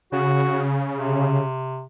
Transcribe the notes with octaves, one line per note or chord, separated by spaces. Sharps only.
C#3 F#4
C3